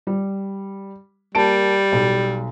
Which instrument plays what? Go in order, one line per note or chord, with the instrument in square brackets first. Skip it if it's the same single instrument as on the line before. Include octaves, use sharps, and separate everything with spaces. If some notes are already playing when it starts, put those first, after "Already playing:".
[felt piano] G3
[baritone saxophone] G3 [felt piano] A#3 A5 D7
[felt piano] B1